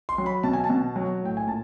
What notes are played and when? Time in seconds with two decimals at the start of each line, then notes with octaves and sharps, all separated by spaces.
0.09 C6
0.18 F#3
0.26 B5
0.43 B2 A5
0.53 G#5
0.64 A5
0.70 B2
0.96 F#3
1.22 A2 G5
1.37 G#5
1.47 A#2 A5